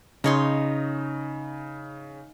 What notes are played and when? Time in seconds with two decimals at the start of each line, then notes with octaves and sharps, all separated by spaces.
0.24 C#3 D#4 C#5 C6